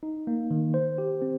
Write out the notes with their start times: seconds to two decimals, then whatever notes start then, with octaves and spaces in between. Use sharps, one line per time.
0.03 D#4
0.27 A#3
0.51 D#3
0.74 C5
0.98 G4
1.22 C4